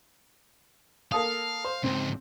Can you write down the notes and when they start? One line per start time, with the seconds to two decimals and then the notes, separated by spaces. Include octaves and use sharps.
1.12 A#3 A4 F5 D#6
1.65 C5
1.84 C#2 G#2 C4